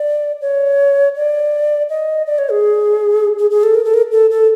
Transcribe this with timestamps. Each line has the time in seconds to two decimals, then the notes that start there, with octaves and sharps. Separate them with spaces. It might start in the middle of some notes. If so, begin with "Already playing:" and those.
Already playing: D5
0.42 C#5
1.16 D5
1.90 D#5
2.26 D5
2.38 C#5
2.51 G#4
3.39 G#4
3.51 G#4
3.63 A4
3.75 A#4
3.85 A4
3.94 A#4
4.12 A4
4.31 A4